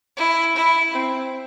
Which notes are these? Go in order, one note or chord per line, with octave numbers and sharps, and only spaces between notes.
E4
E4
C4